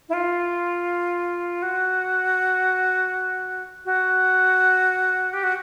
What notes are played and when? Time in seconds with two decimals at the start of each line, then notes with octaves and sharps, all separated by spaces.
0.09 E4
0.13 F4
1.62 F#4
3.85 F#4
5.33 G4
5.43 F#4